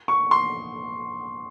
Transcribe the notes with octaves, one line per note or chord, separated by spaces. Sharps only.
C#6
C6